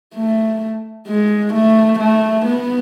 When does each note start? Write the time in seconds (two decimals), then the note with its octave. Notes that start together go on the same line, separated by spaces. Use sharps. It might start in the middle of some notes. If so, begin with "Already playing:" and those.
0.15 A3
1.08 G#3
1.54 A3
2.00 A3
2.46 B3